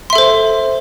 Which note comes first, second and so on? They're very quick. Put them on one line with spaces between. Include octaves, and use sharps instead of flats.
C6 E5 A4 C5